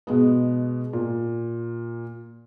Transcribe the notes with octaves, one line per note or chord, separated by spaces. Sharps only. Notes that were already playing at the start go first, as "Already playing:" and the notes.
B2 G#3 B3
A#2